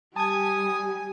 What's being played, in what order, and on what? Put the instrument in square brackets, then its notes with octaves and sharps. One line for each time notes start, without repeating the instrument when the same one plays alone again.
[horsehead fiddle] G3 [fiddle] G#5 [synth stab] A5 G#6 [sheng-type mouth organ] D#6